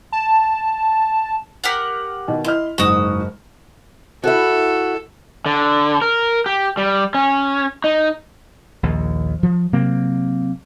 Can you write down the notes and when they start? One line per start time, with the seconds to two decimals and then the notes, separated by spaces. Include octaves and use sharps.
0.12 A5
1.64 G4 A#4 F#5
2.28 B2 D#3
2.45 E4 D#5 C6 F6
2.78 F#1 G#2 G#3 F#4 D#6
4.24 E4 F#4 A4
5.46 D3
6.02 A#4
6.46 G4
6.77 G3
7.14 C#4
7.84 D#4
8.83 A#1 D#2
9.43 F3
9.73 C3 F#3 A#3 C4